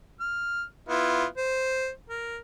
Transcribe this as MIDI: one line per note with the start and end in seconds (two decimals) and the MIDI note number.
0.20 0.63 89
0.89 1.25 59
0.89 1.25 64
0.89 1.25 65
1.37 1.89 72
2.09 2.38 70